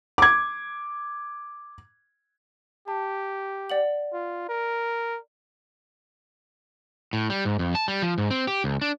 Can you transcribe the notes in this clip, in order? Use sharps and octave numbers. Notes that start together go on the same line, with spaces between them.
D6 G#6
G4 A5
D5 F#5 F#7
F4
A#4
A2
G3
G#2
F2
A5
G3
F3
G#2
C4
G4
C#2
D4